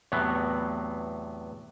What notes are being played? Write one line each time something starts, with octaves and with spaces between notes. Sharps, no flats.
E2 A2 C3 F#3 B3